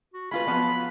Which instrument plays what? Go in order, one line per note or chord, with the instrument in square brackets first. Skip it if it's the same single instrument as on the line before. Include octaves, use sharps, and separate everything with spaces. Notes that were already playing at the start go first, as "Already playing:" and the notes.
[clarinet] F#4
[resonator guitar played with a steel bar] G#3 F4 B4 [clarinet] B5
[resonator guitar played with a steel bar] F3 F#3 B3